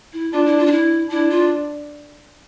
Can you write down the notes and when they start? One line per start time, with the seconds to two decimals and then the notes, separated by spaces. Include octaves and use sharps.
0.13 E4
0.32 D4 F4
0.46 E4
0.58 F4
0.66 D4
0.72 E4
1.10 D4 E4
1.30 F4